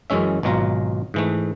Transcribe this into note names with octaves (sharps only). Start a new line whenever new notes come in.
F#2 E3 G#3 C#4 E5
G#1 B2 F#3 F4 A#5
G#2 E3 A3